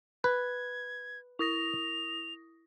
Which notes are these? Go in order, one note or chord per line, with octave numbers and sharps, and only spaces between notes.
B4 G#6
E4 D#6 A#6 F7